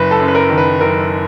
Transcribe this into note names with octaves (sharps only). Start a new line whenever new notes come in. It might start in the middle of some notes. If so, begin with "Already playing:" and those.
Already playing: F#1 B4
A4
F#2
B4
A#4
D#3
B4
F#1 A#4